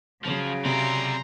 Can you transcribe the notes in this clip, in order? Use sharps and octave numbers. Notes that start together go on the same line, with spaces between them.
C#3 F3 F#3
C3 C4 D5 A#5 C6